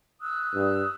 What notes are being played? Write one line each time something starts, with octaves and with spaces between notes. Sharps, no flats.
D#6 E6 F#6
G2